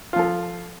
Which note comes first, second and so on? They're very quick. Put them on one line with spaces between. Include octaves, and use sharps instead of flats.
F4 F3 A4